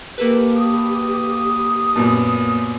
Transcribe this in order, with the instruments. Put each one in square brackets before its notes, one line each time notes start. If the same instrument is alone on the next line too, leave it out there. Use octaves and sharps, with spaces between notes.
[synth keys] A#3 A4 B4 [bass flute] G4
[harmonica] D#6
[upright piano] F#2 A#2 B3